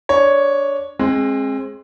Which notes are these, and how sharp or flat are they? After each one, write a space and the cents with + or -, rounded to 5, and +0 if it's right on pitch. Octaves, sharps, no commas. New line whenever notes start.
D4 -10 C#5 +0
G#3 +5 C4 +35